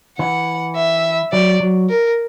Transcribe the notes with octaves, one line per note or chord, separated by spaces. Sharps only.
E3 F#5
E5
F#3 D5
F#3
A#4